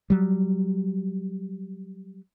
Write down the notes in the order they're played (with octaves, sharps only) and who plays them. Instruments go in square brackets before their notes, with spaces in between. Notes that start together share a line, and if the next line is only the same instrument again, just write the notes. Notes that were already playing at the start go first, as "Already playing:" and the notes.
[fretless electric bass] F#3 G3